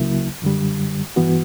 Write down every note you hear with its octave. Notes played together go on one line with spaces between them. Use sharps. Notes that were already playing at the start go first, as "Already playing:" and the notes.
Already playing: C#2 C#3 F#3 A#3 E4
F#2 D3 G3
G2 E3 B3 F#4